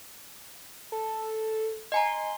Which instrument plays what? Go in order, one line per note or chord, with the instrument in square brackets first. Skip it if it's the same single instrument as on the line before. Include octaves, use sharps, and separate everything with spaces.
[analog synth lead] A4
[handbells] D#5 G#5 A#5 [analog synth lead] C6